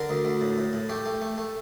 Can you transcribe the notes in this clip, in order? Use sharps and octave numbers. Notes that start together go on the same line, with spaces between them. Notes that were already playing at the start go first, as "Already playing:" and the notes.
Already playing: D3 A#4
D2
D2
A2
A2
A2
A3 G4
A3
A3
A3